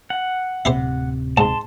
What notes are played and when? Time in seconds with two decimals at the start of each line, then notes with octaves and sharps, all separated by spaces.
0.10 F#5
0.65 D1 C3 E4 G4 C5
1.37 G#2 A5 C6